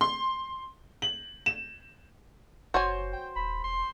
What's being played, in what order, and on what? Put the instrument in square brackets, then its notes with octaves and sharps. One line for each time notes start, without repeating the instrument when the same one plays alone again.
[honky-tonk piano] C6
F#7
E7
[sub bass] F#1 [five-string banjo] F#4 C#5 G#5 [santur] C5
[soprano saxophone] G5
[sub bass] D#1 [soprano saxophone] B5
[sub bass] E1 [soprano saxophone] C6